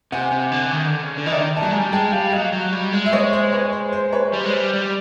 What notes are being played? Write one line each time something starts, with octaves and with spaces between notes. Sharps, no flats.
C3 F#5 G#5
C3
D3
D#3
D3
C#3
D3
E3 D#5
D#3 D5 E5
A5
F#3 G#5 A#5
G#3
G3
G#3 G5 A5
G3 F5 G5
F#3 D#5 F5
F#3
G3
G#3
E5
C#5 D#5
C5
B4 C#5
C5
C5
B4 C#5
G3 C5
G#3
G3
G3